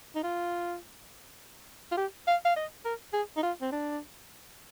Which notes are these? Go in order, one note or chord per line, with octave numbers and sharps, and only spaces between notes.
D#4
F4
F4
G4
F5
F5
D#5
A#4
G#4
D#4
F4
C4
D4